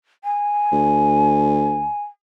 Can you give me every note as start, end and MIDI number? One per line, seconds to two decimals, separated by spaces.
0.24 2.02 80
0.72 1.90 38